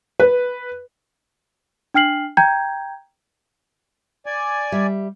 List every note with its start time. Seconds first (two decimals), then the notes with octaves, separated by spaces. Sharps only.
0.20 B4
1.94 D4 G5 F6 C7 F#7
2.37 G5 A#5 G6 G#6
4.26 D5 G#5
4.72 G3 E5